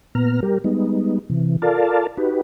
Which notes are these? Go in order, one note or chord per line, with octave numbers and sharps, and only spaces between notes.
A#2 B3 A#5 F6
G3 G4 A#4
G3 G#3 B3 D#4
C3 E3
F4 A4 A#4 D5 F5 A5
D#4 F#4 G4 B4